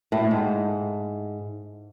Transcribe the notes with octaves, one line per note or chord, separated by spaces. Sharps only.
A2
G#2